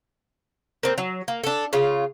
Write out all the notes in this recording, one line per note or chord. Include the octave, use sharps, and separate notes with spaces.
A#3 C4
F#3
A#3
D4 A4
C#3 F4